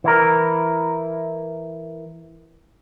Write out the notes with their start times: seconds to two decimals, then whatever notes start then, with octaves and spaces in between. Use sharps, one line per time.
0.04 E3 E4 A#4